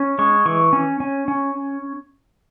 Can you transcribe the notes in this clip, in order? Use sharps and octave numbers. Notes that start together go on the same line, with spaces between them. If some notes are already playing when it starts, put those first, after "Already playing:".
Already playing: C#4
G#3 C#6
E3 C#6
C#4
C#4
C#4